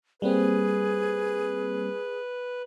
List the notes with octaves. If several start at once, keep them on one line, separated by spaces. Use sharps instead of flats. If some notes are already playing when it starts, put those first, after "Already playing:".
G3 A#3 C4 G#4 B4